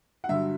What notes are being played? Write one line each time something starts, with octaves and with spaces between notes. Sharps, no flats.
F#5
G2 D3 F#3 E5